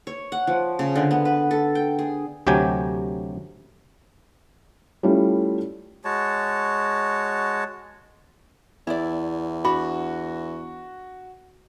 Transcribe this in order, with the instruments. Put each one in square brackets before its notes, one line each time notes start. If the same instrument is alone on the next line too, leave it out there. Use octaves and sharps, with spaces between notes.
[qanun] C#5
F#5
F3
C#3
D3
B3
B4
A4
G5
G#4
[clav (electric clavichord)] D2 C3 F#3 G4 G5 G#5
[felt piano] G3 A3 C#4 E4 F4
[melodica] G#3 F#4 C#5 A5
[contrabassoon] E2 [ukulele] E4 D5
[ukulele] D4 B5 [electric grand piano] F#4